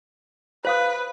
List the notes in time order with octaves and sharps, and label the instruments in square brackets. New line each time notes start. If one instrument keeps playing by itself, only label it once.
[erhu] B4 [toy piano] C5 F5 D#6